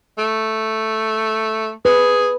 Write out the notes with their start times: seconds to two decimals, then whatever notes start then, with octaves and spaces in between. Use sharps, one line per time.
0.18 A3
1.85 G#4 B4